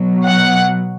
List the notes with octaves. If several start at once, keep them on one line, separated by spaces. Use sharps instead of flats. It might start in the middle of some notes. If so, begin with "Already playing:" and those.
Already playing: B2 F#3
F#5